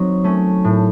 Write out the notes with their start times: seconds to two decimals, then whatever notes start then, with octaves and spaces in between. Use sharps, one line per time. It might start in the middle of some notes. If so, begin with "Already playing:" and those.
Already playing: F#3 C4 D#4
0.24 A3 C#4
0.64 A2